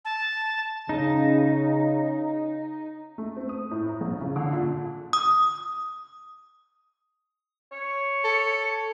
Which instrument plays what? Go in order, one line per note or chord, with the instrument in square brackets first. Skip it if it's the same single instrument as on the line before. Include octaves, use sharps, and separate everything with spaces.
[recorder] A5
[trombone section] C#3 [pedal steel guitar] D#4
[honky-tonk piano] A3
C4
D#6
A2
A#5
A#1
C#3
D3
A#2
[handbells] D#6
[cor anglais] C#5
[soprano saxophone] A4